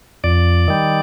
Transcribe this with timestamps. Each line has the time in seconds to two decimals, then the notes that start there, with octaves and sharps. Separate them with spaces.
0.24 F2 D5
0.68 D#3 G3